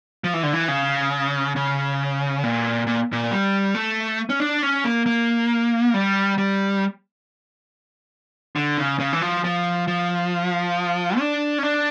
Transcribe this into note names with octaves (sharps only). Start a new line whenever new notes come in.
F3
E3
D3
E3
C#3
C#3
A#2
A#2
A#2
G3
A3
C#4
D4
C#4
A#3
A#3
G3
G3
D3
C#3
C#3
E3
F3
F3
F3
D4
C#4
D4